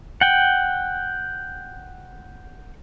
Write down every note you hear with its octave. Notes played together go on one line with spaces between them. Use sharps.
F#5 G5